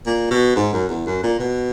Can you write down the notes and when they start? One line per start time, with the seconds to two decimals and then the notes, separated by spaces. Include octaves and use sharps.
0.06 A#2
0.31 B2
0.56 G#2
0.73 F#2
0.89 E2
1.06 F#2
1.23 A#2
1.39 B2